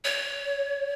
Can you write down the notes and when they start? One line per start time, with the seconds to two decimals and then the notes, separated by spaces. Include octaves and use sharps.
0.05 C#5